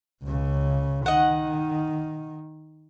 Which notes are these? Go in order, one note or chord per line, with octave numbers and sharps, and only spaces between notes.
C#2 C#3
D#3 D#5 F#5